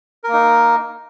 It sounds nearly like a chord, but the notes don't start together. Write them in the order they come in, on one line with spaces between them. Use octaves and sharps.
A#4 A#3 D#4